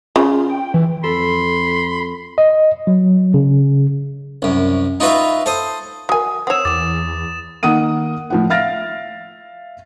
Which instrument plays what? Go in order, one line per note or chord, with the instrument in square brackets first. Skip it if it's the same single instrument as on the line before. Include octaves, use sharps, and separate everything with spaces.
[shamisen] C#3 [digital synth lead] F4
[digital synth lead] G5
E3
[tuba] F2 [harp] A4 [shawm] B5 [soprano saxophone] C6
[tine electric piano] D#5
F#3
C#3
[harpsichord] C2 F#2
D#4 F4 F#4 B4 E5
A4 C5 D#6
[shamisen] F#3 G#5 [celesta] A#4 D#6
[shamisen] C4 C#5 [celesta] F#5 E6 [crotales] D#6 E7
[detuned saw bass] E2 [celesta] D6 [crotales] A6 E7
[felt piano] D#3 A#3 F#5 D#6 D#7
A2 F3 F#5
E5 F5 F6 A6 A#6 D7